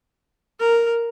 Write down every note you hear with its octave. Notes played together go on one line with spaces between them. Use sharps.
A#4